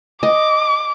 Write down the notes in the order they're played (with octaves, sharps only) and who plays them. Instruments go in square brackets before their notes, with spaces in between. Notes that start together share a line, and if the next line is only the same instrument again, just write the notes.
[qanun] D#5 [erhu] D6